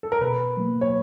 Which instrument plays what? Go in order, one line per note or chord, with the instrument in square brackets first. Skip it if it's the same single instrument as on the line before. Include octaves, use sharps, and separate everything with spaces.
[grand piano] A4
A#4
[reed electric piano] B2 [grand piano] B4
[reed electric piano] F#3 A#3
[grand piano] C#5